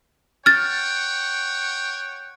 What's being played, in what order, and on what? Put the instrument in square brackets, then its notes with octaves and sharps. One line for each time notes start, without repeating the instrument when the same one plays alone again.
[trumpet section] C#5 F#5 G5 [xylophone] F6 A6